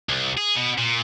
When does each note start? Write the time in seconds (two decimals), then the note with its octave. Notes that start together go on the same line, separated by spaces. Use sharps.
0.09 C2
0.38 G#4
0.56 B2
0.78 A#2